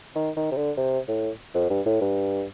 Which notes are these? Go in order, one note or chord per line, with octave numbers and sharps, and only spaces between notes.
D#3
D#3
C3
D3
C3
A2
F2
G2
A2
G2